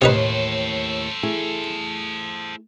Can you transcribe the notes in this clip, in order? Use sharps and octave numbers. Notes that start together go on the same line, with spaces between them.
D#2 A2 C3 D#4 A4 B4 C5
A3 E4 G#4